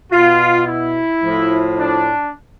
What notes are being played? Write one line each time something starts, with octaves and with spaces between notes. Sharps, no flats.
B2 F4
E4
A2 F3
D4